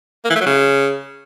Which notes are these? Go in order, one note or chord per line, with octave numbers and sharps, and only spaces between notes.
A#3
E3
A3
F#3
C#3